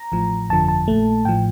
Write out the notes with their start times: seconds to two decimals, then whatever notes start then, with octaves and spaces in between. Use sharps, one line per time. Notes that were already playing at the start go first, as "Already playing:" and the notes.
Already playing: A#5
0.12 A1 A2 F3
0.49 G1 F2 D3 F3 A5
0.68 A5
0.88 A#1 A#2 A3
1.25 A1 A2 F3 G5